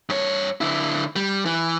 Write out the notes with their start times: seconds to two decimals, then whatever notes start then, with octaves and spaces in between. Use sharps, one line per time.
0.09 G2 C#5
0.61 D3 E4
1.16 G3
1.45 E3